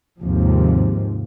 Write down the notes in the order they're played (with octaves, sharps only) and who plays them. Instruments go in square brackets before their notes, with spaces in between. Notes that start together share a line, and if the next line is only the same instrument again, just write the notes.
[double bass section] D#2 G#2 C3 F3